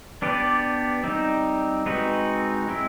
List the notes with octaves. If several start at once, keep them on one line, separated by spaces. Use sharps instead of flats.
B3 D4 G4 B4 D5
G3 C4 D#4
G#3 C4 D#4 F#4 B4
G#3 C4 E4